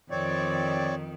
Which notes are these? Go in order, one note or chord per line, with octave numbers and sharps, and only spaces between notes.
F2 D#3 C4 C#5 D5